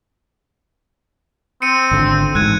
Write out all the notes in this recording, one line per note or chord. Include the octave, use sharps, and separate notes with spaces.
C4 C#7 D#7
G#1 D3
A1 G#2 F#6 G#6 D#7